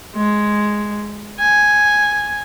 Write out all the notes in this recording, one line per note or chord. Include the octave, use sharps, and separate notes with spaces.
G#3
G#5